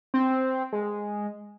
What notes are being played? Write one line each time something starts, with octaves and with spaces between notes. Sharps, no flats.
C4
G#3